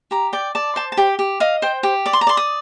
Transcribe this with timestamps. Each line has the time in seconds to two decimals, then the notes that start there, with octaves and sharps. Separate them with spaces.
0.11 G4 A#5
0.33 D5 G5
0.55 D5 A5
0.76 C5 A5
0.92 A5
0.97 G4 G5
1.19 G4
1.40 D#5 F5
1.62 C5 G5
1.83 G4
2.06 D5 D6
2.13 C6
2.21 A#5
2.27 D5 C6
2.37 D#6